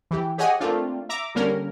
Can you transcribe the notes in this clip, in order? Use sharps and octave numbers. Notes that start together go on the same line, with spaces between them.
E3 G4
G4 G#4 C#5 D#5 F#5 G#5
A3 A#3 C4 D4 F4
E5 A#5 D6
D3 G3 A#3 C#4 A#4